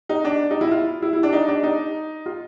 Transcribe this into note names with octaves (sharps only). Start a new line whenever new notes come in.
D#4
D4
D#4
E4
F4
E4
E4
D4
D#4
D4
D#4
F4